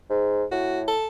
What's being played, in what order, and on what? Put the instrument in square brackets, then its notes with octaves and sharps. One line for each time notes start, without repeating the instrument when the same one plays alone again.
[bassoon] G#2
[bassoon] A2 [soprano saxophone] F#4
[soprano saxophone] A4